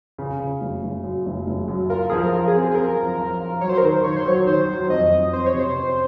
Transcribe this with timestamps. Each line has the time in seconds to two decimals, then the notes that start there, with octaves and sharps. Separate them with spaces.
0.18 C#3
0.40 C#3
0.61 F#1
0.83 F#1
1.04 F#2
1.26 F#1
1.47 F#1
1.68 F#2
1.90 F4 A#4
2.10 F3 G#4
2.18 A#4
2.33 F4
2.47 G#4
2.55 C4
2.71 G#4
2.75 C4 A#4
2.97 F3
3.18 F3
3.40 F4
3.61 F#3 C#5
3.69 C5
3.78 A#4
3.82 D#3 C5
4.04 D#3 C#5
4.16 C5
4.26 F#3 C#5
4.46 D#3 C5
4.69 F#3
4.89 F2 D#5
5.11 F2
5.32 C4 C5
5.46 C#5
5.54 C3
5.59 C5
5.76 C4